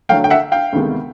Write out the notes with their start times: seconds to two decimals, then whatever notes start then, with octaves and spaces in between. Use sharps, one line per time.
0.09 D3 F#3 A3 F5 G5
0.24 G5
0.30 E5 F#5
0.52 F5 G5
0.73 D2 C3 D#3 G#3 B3